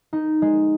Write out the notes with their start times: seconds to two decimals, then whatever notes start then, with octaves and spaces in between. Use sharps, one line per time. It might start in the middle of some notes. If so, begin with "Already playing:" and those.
0.13 D#4
0.42 G#3